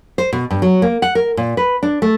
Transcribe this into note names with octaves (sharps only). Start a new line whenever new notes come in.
C5
B2
G2
F#3
A#3
F#5
A#4
A#2
B4
D4
A3